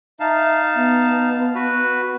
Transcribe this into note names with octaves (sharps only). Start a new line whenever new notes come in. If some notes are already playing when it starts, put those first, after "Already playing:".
D#4 E5 F5 A5
B3
F#4 B4